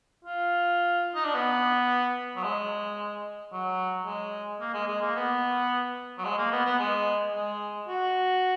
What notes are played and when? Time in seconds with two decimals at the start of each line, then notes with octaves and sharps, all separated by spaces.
0.25 F4
1.15 D#4
1.25 D4
1.34 B3
2.36 F#3
2.44 G#3
3.52 F#3
4.06 G#3
4.61 A#3
4.74 G#3
4.88 G#3
5.01 A#3
5.16 B3
6.18 F#3
6.25 G#3
6.38 A#3
6.52 B3
6.66 B3
6.79 G#3
7.33 G#3
7.88 F#4